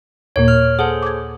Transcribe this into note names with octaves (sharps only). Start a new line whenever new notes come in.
D#2 A#2 A#3 C#5
F6
G#4 A4 C5 F#5 A5
D6 G#6